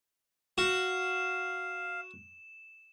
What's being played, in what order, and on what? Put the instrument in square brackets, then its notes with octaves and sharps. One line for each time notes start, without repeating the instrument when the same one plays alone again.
[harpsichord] F#4 [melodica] F5 [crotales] E7